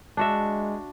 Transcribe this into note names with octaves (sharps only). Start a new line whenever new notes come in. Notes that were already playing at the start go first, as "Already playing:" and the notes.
G#3 D4 F#4 E5